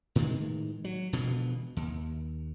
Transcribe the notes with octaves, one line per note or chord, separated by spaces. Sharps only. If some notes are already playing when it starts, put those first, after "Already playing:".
A2 D#3 E3 G#3
F#3
E1 B2 D3 F3
D#2